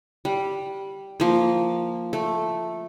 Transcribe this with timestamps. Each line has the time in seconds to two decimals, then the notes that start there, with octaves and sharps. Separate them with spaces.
0.25 G3
1.20 F3 A#3
2.13 A3